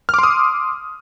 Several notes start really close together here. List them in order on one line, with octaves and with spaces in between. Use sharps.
F6 D6 C6 D#6